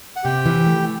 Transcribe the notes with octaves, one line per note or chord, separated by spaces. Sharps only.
F#5
C3 G4 G5
E3
A3